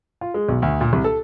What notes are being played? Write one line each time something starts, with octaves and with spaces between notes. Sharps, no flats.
F4
G#3
B1
D2
A#2
C2
A4